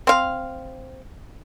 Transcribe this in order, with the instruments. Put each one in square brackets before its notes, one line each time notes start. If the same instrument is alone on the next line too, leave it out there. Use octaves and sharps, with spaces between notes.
[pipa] C4 F5